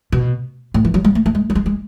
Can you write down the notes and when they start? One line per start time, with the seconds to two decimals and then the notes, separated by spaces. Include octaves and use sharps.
0.12 B2
0.74 A2
0.85 E3
0.94 F#3
1.05 G#3
1.15 A3
1.26 A3
1.35 G#3
1.50 F#3
1.55 G#3
1.66 G#3